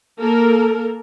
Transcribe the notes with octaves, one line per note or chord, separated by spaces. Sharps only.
A#3 A4 A#4